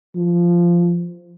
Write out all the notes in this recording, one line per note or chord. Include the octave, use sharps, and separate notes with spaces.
F3